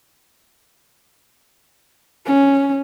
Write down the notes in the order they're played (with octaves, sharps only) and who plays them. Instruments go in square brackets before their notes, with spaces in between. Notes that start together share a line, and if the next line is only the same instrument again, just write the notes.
[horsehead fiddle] C#4